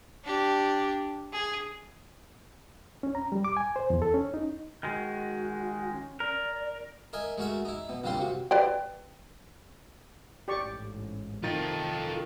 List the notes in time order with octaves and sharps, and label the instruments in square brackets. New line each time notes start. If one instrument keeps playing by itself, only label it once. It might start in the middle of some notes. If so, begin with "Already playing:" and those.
[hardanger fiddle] D4 G4
G#4
[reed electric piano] C#4
A#5
G3
D6
G#5
C5
E2
A4
C#4
D#4
[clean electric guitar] D#3 G#3 [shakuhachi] F#4
[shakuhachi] C#4
[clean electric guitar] A#4 [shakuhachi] D5
[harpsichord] A#4 D#5 E5 G#5
G#3 A3 F#4 A#4 E5
D#4 E4
B2
A#1 A#2 G3 C4 F4 C6
C3 F#4
[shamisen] B4 D5 G5
[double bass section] A1 G#2 [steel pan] G4 D5 C#6
[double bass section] C3 A3 [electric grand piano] D#3 A6 [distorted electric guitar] F4 A4